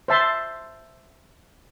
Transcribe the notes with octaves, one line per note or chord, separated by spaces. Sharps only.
C5 E5 A5 C6